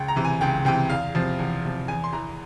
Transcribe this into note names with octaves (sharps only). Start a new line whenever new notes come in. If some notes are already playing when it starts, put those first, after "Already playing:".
Already playing: C#2 G5
A#5
C3 E3
G#5
C#2 G5
C3 E3 G5
E2 F5
C3 F3
E2
C3 F3
E2 G#5
C6
E3 A#5